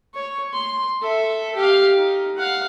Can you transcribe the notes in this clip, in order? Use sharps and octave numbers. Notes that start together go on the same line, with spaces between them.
C#5
C6
A4 E5
G4 F5
D#4
F5 F#5